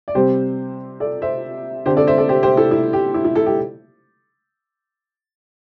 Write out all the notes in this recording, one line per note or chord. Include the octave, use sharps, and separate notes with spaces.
D5
C3 G3 C4 G4 C5
A4 D5
C5 E5
D3 C4 G4 C5
A4 D5
C5 E5
A4 D5
G4 C5
G4 C5
E4 A4
E4
G4
E4
E4
E4 A4
G4